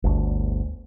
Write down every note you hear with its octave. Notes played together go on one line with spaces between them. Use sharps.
G1 D2